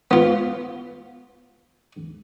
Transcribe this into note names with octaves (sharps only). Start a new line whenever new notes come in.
B3 F4